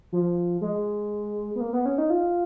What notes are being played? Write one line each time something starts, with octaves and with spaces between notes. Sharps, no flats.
F3
G#3
B3
A#3
B3
C#4
D#4
F4